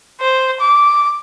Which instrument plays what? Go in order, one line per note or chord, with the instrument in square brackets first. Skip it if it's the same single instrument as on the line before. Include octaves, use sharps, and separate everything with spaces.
[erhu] C5
D6